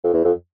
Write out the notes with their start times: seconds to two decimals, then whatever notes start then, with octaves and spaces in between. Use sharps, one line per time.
0.04 F2
0.14 E2
0.25 F2